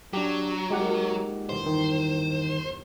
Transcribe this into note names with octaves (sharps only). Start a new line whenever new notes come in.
F#3 D4 G4
G#3 A#3 D#4 F4 G4 F#5
G1 E2 C3 C5
D#3